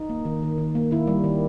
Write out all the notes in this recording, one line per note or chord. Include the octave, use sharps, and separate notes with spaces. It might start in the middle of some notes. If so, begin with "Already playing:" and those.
Already playing: D#4
A#3
D#3
D#3
D#3
A#3
D#3 E4
G3
D#3